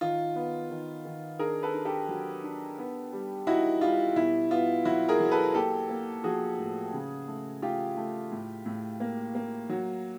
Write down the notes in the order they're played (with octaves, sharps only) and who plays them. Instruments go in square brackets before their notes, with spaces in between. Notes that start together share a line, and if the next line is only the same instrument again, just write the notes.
[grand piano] D#3 F4
B3
D#3
D#3
D4 G#4 A#4
A4 B4
D4
G4 A4
F#3
D4
B3
G3
D#4 E4 F#4
G3 F4
B2 E4
B3 F4
F#3 E4 F#4
G#4 A#4
F#3
A4 B4
A#3 G4 A4
A#3
F3 F#4 G#4
A2
C#3
A3
A3 F4 G4
A3
A2
A2
A#3
A#3
F#3